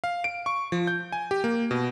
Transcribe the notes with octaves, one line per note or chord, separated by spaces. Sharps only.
F5
D7
C#6
F3
G6
G#5
G4
A#3
B2